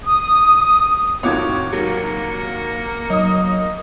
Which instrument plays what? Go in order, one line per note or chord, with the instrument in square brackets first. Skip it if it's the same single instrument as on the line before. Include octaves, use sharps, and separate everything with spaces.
[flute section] D#6
[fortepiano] F2 A2 D#3 [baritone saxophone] F#4 [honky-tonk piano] C#5 D6 G#6
[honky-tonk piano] D#2 F#3 [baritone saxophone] A#3 [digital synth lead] C#7
[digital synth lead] F#3 [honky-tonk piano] D#4 D#6